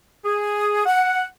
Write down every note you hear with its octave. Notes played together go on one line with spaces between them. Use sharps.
G#4
F#5